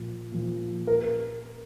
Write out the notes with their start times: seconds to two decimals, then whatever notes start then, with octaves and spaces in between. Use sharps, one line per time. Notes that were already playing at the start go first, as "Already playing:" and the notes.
Already playing: A#2 F3
0.32 A#2 F3
0.87 A#4